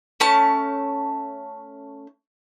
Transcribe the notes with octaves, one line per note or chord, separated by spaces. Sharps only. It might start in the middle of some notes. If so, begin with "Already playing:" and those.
A3 C#4 A5